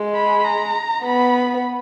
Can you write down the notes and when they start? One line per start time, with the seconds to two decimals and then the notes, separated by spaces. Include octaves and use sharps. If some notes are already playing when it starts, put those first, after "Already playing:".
Already playing: G#3
0.15 B5
0.45 A#5
1.04 B3 B5